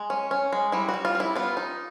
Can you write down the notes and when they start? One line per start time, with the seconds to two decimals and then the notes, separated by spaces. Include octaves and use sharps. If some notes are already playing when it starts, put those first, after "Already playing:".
Already playing: G#3
0.10 C#4
0.31 C#4
0.53 G#3
0.72 G3 E4
0.89 F#4
0.94 G3
1.05 F4
1.15 G3
1.20 E4
1.35 B3 F4
1.57 D#4